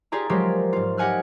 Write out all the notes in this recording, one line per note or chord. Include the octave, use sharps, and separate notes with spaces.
F4 G4 G#4 D5 A#5
F3 F#3 G#3 F4 G4 A#4
G#2 F4
G4 D#5 F#5 G#5 F6 F#6